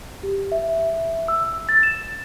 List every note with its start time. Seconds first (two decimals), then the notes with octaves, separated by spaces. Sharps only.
0.23 G4
0.52 E5
1.28 E6
1.69 A6
1.83 E7